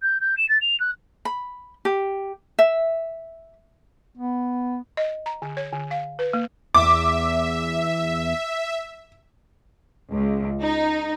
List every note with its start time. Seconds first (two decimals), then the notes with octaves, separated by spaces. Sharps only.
0.02 G6
0.21 G6
0.37 E7
0.49 A6
0.61 F7
0.80 F#6
1.25 B5
1.85 G4
2.59 E5
4.17 B3
4.97 D#5
5.26 A#5
5.42 D3
5.57 C#5
5.72 D3
5.91 F5
6.19 B4
6.33 A#3
6.75 E2 E5 D6
10.13 C#2
10.63 D#4